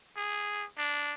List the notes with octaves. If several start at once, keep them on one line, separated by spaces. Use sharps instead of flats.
G#4
D4